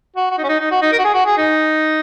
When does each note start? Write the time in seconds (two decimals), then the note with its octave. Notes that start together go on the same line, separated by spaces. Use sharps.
0.16 F#4
0.31 F#4
0.38 D#4
0.44 C#4
0.49 D#4
0.60 D#4
0.71 F#4
0.82 D#4
0.92 A#4
0.99 F#4
1.04 G#4
1.14 F#4
1.26 G#4
1.37 D#4